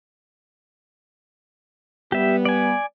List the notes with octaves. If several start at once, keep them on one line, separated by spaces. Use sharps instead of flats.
G3 B3 G4 E5
D5 G#5